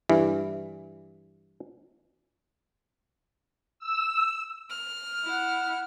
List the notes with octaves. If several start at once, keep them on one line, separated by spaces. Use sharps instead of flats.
G2 E3
E6
F6
E4 F#5